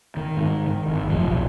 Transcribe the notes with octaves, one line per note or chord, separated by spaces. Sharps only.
D#3
G#2
D#3
G#1
F1 A2 F3
B1 E2